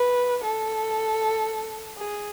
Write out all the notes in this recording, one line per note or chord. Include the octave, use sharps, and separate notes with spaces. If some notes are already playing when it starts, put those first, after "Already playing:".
Already playing: B4
A4
G#4